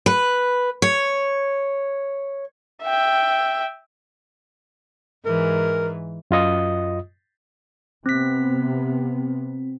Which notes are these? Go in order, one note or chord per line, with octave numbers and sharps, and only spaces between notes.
B4
C#5
E5 G5
G#2 E3 A#4
F#2 F4 D#5 D#6
C3 B3 C4 B6